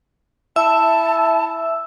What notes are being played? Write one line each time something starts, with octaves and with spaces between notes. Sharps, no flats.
E4 E5 A5 E6